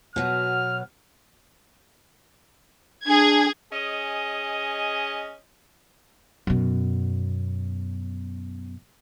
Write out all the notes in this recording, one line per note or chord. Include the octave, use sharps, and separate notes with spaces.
B2 F#3 B3 F6
D4 G#4 G#6
C#4 G#4 D#5
F#2 B2